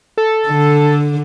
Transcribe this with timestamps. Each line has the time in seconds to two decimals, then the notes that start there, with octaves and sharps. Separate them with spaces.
0.18 A4
0.48 D3